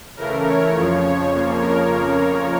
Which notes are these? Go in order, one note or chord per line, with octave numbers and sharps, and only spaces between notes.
C#3 E3 A3 A#4
C#5
F2 C#3 F3
C#5
F2 C#3 F3 A#3
A#4